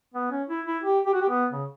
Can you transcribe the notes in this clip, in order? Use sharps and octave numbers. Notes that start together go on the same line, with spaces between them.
B3
C#4
E4
E4
G4
G4
F#4
G4
B3
C#3